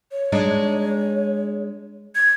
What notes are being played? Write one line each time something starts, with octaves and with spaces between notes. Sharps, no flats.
C#5
G#3 D4 D#4
G#6